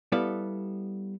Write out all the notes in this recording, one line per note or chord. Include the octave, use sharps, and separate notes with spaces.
G3 B3 E4 A4 F5